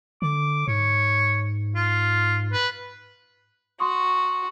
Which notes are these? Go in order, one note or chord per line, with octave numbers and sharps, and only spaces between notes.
D3 D6
G#2 C#5
F4
B4
F#4 C6 C#6 D#6